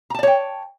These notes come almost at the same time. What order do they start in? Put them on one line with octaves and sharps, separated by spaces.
A#5 A5 D5 C#5 G5